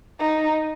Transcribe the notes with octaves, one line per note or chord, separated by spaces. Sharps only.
D#4